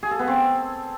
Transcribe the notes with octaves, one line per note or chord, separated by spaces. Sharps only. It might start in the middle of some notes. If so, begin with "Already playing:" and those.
G#4
A4
B3
C4